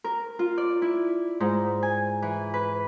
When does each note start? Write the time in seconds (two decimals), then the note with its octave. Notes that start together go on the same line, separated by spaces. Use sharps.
0.04 A#4
0.39 F4
0.58 D5
0.82 E4
1.40 G#2
1.83 G#5
2.22 E3
2.54 B4